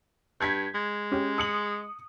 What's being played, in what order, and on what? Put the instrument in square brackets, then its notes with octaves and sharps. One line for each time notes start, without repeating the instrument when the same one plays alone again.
[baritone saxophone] G2 [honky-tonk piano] G6 G#6 B6
[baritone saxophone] G#3
[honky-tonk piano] C#4 G4
D#6 C#7 F#7